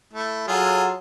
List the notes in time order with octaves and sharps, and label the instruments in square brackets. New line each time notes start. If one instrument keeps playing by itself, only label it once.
[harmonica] A3 E4
[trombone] F#3 [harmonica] F4 G#4 A4